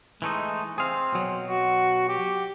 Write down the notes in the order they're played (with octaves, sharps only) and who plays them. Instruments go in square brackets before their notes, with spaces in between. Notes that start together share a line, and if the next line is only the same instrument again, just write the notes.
[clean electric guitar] E3 A3 D#4 [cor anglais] G#3
[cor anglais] C4 [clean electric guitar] G#4 F5
[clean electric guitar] B2 F#3
[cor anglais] F#4
G4